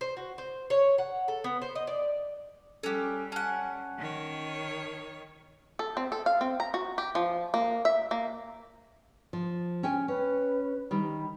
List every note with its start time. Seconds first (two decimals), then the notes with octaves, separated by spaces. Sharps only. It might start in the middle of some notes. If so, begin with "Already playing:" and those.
0.01 C5
0.17 F#4
0.38 C5
0.70 C#5
0.98 F#5
1.28 A4
1.44 B3
1.62 C5
1.75 D#5
1.87 D5
2.83 G3 C#4 G4 A4 F#6
3.32 C#4 F#5 A5
3.97 D#3 C#5
5.79 A4
5.97 C4
6.12 A4
6.26 F5
6.41 C4
6.60 A#5
6.74 F#4
6.98 G4
7.15 F3
7.54 A#3
7.85 E5
8.11 A#3
9.33 F3
9.83 C#4 G5 G#5
10.08 C#4 B4
10.91 D#3 G3 B5